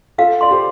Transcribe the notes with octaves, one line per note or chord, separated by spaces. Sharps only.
F4 A4 F5
D5 C6
G4 C5